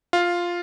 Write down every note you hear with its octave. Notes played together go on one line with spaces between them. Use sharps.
F4